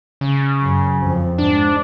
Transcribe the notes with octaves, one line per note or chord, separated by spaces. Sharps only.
C#3
F#2
F2
G#2 D4